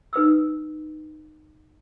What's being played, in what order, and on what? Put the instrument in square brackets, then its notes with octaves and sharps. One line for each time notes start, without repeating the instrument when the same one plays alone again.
[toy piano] D#4 B4 D#6 E6